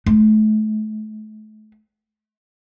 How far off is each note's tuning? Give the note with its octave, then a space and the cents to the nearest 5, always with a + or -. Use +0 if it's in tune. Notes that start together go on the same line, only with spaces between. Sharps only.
A3 -35